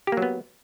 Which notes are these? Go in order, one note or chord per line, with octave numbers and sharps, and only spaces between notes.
F#3 A#3 B3 G4